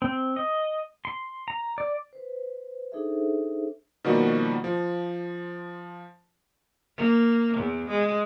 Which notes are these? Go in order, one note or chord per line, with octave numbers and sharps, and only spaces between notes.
C4
D#5
C6
A#5
D5
B4 C5
D4 D#4 G#4 A4 C5 E5
B2 D#3 F3 G3 A#3 F#4
F3
A#3
E2
G#3